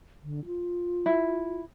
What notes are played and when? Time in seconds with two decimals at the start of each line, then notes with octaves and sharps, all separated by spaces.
0.23 D3
0.46 F4
1.06 E4